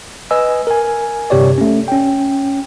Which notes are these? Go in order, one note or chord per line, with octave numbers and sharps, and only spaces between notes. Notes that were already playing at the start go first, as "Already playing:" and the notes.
B4 D#5 G#5 E6
A#4 G#5
G1 G2 C3 G4 C#5 D5
A3 C#4
C#4 G5